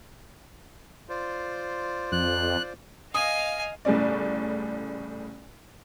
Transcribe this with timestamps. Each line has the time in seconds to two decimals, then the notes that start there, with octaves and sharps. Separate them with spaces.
1.09 F4 C5 D5
2.12 F2 F#6
3.15 D#5 F5 G#5 D#6
3.85 G1 A2 C#3 C#4 D5